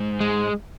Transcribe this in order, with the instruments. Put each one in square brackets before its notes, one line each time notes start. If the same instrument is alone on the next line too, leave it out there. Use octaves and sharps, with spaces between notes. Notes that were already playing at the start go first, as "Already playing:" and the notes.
Already playing: [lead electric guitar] G#2
[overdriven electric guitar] G#3